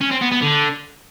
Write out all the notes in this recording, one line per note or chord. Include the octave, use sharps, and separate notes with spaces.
C#4
C4
B3
B3
D3